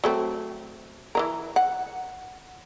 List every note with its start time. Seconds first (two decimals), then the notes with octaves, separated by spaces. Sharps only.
0.04 F#3 A3 C4
1.15 E3 F#3 A#4
1.56 F#5